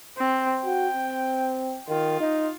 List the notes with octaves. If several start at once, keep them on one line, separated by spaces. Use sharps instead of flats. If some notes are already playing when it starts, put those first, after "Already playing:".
C4
F#4 G5
C4
D#3 F4
D#4